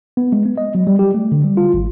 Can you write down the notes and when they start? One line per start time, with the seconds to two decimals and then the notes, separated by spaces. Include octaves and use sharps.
0.17 B3
0.32 G#3
0.45 B3
0.58 D#5
0.75 F#3
0.87 G3
0.99 G4
1.14 A3
1.32 D3
1.44 G3
1.57 F4
1.74 G#1